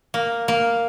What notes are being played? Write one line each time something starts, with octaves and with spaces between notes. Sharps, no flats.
A#3
A#3